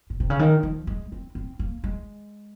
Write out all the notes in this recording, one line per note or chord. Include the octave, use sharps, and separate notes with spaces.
A#2
C3
C#3
D#3
F3
G#3
C4
C4
A#3
G#3